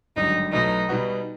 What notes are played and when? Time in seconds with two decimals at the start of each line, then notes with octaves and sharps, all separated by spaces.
0.16 G#1 G2 D3 F#3 D#4
0.52 B1 B2 F#3 A3 D#4
0.89 B2 G3 B3 D#4 F#4